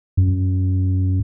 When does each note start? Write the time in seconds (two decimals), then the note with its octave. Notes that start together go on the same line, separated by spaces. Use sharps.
0.17 F#2